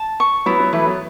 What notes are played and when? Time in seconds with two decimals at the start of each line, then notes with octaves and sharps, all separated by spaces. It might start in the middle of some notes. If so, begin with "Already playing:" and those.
Already playing: A5
0.20 C#6
0.46 F#3 B3 E4
0.59 F#3 B3
0.73 E3 A3 B4
0.86 F#3 B3